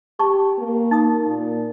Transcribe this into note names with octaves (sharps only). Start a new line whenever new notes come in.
G4 A5 C#6
A#3
D#4 D#6
A#2